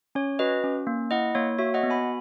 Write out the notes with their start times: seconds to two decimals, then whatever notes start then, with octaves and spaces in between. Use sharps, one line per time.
0.15 C#4 C#5
0.39 F#4 B4 D#5
0.64 C#4
0.87 A#3
1.11 E4 D#5 F#5
1.35 A#3 C#5
1.58 F#4 C#5 E5
1.74 D#5 F#5
1.83 B3
1.90 G#5 B5